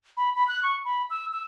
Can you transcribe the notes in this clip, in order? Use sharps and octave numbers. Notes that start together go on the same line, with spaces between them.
B5
B5
F#6
C#6
B5
E6
E6